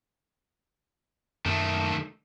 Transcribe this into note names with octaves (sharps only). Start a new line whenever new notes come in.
F#2 D#3 A3